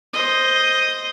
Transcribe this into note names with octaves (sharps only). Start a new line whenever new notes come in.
C5 D#5